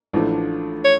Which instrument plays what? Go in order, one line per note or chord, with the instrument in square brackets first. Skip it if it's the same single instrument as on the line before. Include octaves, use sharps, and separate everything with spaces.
[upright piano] A1 A2 F3 A3 D4
[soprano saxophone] C#5